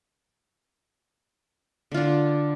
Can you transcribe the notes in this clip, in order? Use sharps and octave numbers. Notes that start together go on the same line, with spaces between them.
D3 D4 F4